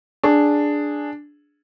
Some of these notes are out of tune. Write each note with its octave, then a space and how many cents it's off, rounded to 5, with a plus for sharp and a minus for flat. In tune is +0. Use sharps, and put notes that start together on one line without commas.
D4 +0 G#4 +0